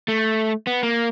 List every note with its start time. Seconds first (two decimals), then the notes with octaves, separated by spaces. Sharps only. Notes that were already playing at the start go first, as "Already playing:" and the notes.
0.08 A3
0.67 B3
0.83 A#3